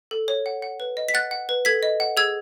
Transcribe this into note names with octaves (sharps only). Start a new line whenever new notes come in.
A4
C#5
F#5
F#5
B4
D#5
B6
F#5 F#6 A6
F#5
B4
A4 G#6 B6
D#5
F#5
G#4 E6 G#6